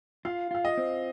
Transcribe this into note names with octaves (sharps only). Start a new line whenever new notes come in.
F4 F5
F4 F5
D#5
C4